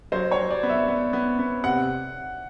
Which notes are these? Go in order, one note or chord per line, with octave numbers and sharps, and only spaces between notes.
F#3 C5
C#5
F#3
D5
B3
E5
B3
B3
B3
C3 F#5